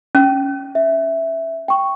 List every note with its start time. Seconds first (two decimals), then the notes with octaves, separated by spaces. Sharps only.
0.15 C#4
0.75 E5
1.68 G5 C#6